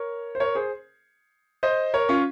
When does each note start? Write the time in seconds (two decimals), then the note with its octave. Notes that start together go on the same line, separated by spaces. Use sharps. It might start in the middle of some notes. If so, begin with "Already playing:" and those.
Already playing: A#4 C#5
0.35 C5
0.40 A#4 C#5
0.55 G#4 C5
1.63 C5 D#5
1.94 A#4 C#5
2.09 C#4 F4